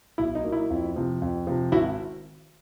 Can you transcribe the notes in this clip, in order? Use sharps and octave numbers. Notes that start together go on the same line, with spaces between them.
B1 E4
D#4
A#2 F#3 A#3
E4
F2
C3 F3
F2
C3 F3
G#1 E4 F#4